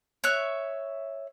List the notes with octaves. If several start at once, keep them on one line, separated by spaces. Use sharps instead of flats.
C#5 E5 F#6